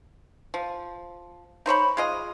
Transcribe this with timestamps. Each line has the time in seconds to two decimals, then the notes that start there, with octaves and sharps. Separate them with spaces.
0.54 F3
1.66 D#4 C5 C#5 B5
1.97 G#3 F4 D#5